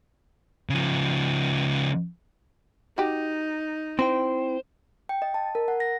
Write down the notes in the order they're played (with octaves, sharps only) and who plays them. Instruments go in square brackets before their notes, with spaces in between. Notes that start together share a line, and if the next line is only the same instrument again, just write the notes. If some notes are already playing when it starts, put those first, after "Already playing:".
[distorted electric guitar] C#3 F3
[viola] D#4 [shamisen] F#4 G4
[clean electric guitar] C4 E4 G5 [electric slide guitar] C5
[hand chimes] G5
D#5
A5
A#4
F#5
A#6